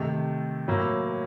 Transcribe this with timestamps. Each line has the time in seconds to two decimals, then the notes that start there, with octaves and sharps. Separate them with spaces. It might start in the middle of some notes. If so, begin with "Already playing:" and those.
Already playing: C3 D#3 A3
0.68 A2 F#3 A#3